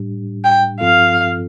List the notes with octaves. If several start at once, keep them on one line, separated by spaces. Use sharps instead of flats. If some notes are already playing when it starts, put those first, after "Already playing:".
Already playing: A2 G3 D4 G4
G5
G2 F3 C4 F4 A4 F5